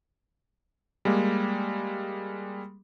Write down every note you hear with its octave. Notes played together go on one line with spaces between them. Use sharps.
G3 G#3 A#3